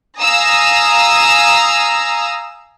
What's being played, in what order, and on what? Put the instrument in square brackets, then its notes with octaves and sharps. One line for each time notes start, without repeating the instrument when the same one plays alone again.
[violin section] F5 G#5 A#5 D#6 E6 A#6